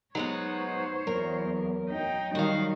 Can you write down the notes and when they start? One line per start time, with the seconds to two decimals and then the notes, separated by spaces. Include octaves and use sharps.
0.15 F#3 G#3 B3 D#4 C5 C#5
1.07 E2 F#3 A#4
1.90 D#4 G5
2.35 D#3 G3 D#4 F#4 F5